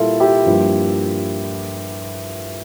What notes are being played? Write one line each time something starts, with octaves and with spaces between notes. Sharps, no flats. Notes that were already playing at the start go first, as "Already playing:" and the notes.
Already playing: A#2 G3 A#3 E4 F4 A4
E4 G4
G2 F3 A#3